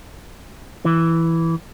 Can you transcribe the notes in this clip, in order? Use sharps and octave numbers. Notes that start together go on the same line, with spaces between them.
E3